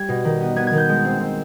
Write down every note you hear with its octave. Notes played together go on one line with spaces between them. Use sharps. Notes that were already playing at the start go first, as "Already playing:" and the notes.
Already playing: G3 G#6
B2
D#3
B3
B3 G#6
G#6
D#3 G6
G#3
C4
C4